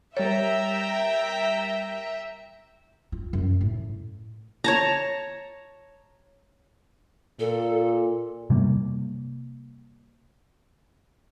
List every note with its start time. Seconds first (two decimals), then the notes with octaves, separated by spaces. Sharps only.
0.17 G3 A#4 C#5 E5 G5 A#5 A6
3.12 F4
3.33 F#2
3.61 A2
4.64 C#5 A5 A#5
7.39 A#2 A4
8.50 C3 G3 A3 A#3